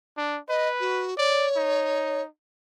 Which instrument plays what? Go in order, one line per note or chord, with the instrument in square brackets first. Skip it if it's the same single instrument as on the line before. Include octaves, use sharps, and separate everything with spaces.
[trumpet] D4
[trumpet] B4 [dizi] D#5
[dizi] F#4
[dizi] C#5 [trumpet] D5
[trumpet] D#4